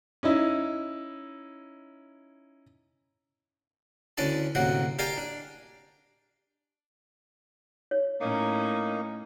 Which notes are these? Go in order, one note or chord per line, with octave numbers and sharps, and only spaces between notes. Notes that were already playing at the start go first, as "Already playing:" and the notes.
C#4 D#4 E4
D2 E3 C#4 D4 D5 A5
A1 D2 C3 F#3 A#3 F#5
G4 A#4 D5 F5 G5 G#5
D4
C#5
A2 A#3 C#4 D#4